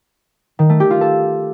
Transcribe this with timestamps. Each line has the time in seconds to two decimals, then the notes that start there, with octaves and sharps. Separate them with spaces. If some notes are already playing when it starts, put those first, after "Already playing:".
0.59 D#3
0.69 A3
0.80 G4
0.91 F4
1.01 A4